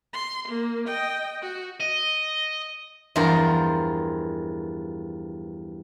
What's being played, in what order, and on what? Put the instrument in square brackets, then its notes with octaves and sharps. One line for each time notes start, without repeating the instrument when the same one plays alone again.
[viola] C6
A#3
D#5 G5
F#4
[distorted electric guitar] D#5
[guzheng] E2 G2 F3 F4 A#4